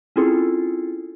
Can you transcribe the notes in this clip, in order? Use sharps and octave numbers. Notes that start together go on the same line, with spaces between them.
C4 C#4 E4 F4 G#4 A4